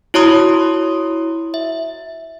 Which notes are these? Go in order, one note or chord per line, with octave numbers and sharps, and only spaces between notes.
E4 F#4 C#5 A#5 C6 D#6
E5